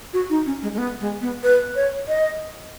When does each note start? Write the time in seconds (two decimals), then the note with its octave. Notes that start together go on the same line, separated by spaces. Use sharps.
0.13 F#4
0.30 D#4
0.46 C#4
0.62 G#3
0.73 G#3
0.78 B3
1.00 G#3
1.21 B3
1.43 B4
1.76 C#5
2.08 D#5